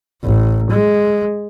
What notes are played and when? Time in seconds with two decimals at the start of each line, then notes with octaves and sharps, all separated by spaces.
0.24 A1
0.71 G#3